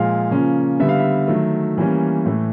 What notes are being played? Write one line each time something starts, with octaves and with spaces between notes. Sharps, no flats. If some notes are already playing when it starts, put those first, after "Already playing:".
Already playing: A#2 F3 G#3 F5
C#3 F3 A#3 C#4
D3 G3 B3 E5
F5
E5
D#3 F#3 A3
E3 G3 A#3 C#4
A2 E3 A3